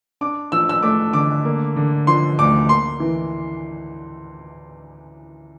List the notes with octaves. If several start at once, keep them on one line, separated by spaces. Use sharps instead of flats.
D4 D6
F3 E6
E6
A3 D6
D3 D6
A#3
D3
F3 C6
D2 D6
A#3 C6
E3